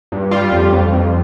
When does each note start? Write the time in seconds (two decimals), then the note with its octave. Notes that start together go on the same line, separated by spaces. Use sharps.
0.12 G2
0.31 G3 F4
0.52 F2
0.72 F2
0.93 F2